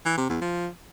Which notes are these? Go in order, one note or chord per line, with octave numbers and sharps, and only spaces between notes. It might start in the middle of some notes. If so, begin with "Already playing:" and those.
E3
C3
E2
F3